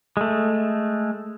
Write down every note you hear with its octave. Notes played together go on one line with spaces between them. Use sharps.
G#3 A3